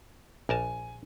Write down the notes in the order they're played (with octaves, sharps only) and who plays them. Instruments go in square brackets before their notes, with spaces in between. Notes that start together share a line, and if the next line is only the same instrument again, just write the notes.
[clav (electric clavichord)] A#1 A#4 A5 [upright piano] G#5